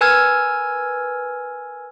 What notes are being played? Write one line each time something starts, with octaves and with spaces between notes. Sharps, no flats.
A#4 B4 G#5 E6 F6 G#6